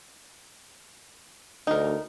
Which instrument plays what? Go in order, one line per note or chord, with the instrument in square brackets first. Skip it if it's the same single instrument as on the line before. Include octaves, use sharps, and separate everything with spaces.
[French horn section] D2 [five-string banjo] D#4 A#4